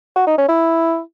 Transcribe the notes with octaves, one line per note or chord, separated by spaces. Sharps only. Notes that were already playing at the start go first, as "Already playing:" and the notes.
F#4
D#4
C#4
E4